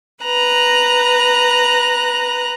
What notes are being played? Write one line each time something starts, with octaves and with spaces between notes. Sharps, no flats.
B4 A#5 F#6